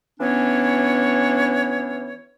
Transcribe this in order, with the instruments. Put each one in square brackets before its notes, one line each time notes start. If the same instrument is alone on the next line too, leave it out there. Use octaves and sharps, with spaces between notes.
[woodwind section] E3 B3 C#4 D4 C#5